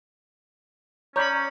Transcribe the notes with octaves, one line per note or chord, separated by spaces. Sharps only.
C#4 C#5 D5 A#5 B5 G6